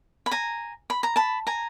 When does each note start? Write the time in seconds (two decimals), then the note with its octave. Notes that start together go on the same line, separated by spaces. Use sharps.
0.26 B5
0.31 G#5 A#5
0.90 B5
1.03 A#5
1.16 A5 B5
1.47 G#5 A#5